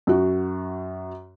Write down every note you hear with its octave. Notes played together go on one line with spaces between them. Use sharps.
F#2 F#4